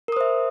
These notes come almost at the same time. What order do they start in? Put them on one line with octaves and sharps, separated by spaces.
A#4 D#6 C5 E5